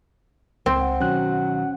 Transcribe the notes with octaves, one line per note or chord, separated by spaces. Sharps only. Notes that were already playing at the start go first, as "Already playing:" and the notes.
C#2 C4
F#5
B2 D#3 F#3 C#4 F#6